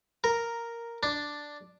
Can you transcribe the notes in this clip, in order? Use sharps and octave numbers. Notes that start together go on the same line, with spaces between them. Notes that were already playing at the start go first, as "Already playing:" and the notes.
A#4
D4